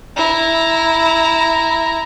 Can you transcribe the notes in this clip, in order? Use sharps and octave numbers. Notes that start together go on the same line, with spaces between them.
E4 A#5